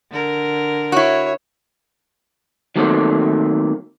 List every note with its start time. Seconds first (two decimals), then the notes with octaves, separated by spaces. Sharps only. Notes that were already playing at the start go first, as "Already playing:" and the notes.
0.11 D3 A#4
0.92 E4 F#4 C#5
2.76 D#3 F#3 A3 A#3 C4